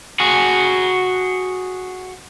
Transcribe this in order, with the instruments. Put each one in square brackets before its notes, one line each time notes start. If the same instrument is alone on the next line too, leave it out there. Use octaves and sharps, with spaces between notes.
[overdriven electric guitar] F#4 G#4